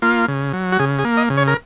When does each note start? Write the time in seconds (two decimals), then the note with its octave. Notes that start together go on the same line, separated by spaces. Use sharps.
0.02 A#3 F4
0.28 C#3
0.53 F#3
0.72 F#4
0.79 C#3 G#4
0.99 G#4
1.05 A#3
1.17 D#5
1.30 C#3
1.37 C#5
1.47 A#4